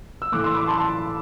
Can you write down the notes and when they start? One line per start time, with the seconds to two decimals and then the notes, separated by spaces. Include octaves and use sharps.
0.22 E6
0.32 A2 E3 A3 D6 F#6
0.44 C6 E6
0.55 B5 D6
0.67 A5 C6
0.78 A5 C6